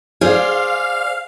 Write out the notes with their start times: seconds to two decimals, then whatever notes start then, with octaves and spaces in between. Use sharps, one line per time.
0.21 G#4 C5 D5 F5